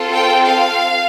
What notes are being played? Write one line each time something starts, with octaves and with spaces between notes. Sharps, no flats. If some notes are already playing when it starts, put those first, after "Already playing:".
Already playing: C4 F4 A4
G5
F5